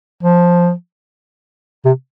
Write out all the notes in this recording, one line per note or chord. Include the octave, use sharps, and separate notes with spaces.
F3
C3